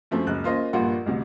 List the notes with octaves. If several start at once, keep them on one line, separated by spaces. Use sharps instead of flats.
F#2 F3 A3 C4
F#1 C#2 F#6
A#3 C#4 F4 C5 D#5
A#1 G2 A#3 F4 F#5
A1 D2 C3